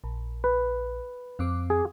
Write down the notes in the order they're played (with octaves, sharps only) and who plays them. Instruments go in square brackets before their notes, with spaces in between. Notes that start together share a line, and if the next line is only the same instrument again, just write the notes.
[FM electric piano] A#1
[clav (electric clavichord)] B4
[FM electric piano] F2 C4 D6
[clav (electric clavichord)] G#4